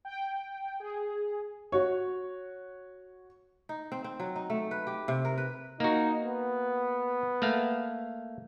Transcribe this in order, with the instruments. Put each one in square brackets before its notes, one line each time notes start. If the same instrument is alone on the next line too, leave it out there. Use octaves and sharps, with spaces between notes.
[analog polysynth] G5
G#4
[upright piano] F#4 C#5
[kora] D#4
C4
C4
F#3
D#4
A3
B4
G4
C3
A#4
B4
[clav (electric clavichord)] A#3 F#4 [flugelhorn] D#4
[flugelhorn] B3
[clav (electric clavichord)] A3 A#3 F5